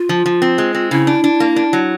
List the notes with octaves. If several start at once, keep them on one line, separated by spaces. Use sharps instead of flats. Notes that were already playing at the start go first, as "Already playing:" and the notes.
Already playing: F4
F3
F3
C4
G#3
C4
C#3 E4
D4
D4
A#3
D4
F#3